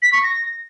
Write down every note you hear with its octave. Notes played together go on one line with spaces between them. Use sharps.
B6
C#6
A#6